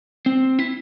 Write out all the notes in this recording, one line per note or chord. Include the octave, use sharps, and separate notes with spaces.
C4
E4